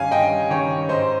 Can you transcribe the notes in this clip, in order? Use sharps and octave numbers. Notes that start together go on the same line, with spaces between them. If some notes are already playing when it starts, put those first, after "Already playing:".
Already playing: G2 D#3 G3 C#4 F5 G#5
G2 D#5 G5
D#3 G3 C#4 C#5
G#2 C5 D#5